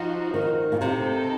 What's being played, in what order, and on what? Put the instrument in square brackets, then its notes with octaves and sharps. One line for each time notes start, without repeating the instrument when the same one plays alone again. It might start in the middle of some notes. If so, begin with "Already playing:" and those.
Already playing: [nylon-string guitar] F3 [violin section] D#4 F#4 C5
[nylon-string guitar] D#3
A#2
[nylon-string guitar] C3 [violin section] C4 D#4 A4